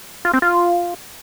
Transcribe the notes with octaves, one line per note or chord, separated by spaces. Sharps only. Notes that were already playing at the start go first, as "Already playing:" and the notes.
F4
C4
F4